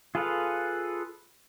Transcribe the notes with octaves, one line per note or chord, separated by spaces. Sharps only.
F4 G#4 A4 B4 F5